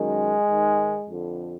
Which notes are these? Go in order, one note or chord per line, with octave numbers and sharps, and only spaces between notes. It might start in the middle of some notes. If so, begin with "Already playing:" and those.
Already playing: F#2 D#3 G#3
G#2 D#3
F2 D3